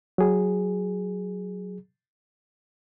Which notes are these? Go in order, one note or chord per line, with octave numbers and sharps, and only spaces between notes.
F#3 G#4